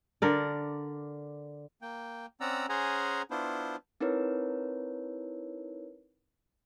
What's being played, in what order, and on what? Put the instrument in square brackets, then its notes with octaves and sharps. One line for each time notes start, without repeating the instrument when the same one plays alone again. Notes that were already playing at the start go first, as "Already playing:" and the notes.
[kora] D3 A#4 D5
[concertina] A#3 G5
C4 C#4 D5 F#5 A#5 E6
C#4 G#4 C5 F#5 G#5 A#5
B3 D4 E4 F4 C5
[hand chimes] C4 D#4 E4 A#4 B4 C#5